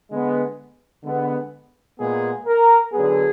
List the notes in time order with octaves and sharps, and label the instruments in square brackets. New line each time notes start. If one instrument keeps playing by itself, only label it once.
[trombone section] D3 G#3 B3
D3 G#3 B3
A#2 G#3 B3 G#4
A#4
D3 F#3 B3 G#4